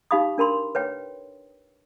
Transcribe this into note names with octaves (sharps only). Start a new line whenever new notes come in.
D#4 G4 F5 B5 D#6
D4 A#4 B5 C6
B4 C#5 G5